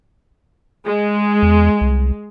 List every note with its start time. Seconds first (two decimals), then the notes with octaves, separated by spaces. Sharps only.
0.85 G#3
1.42 E2
1.81 C2